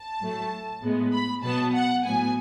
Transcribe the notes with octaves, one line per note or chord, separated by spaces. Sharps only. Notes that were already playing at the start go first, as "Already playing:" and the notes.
Already playing: A5
A2 F#3 A3
A2 G#3 B3
B5
B2 F#3 B3 A5
F#5
A2 F#3 B3 G#5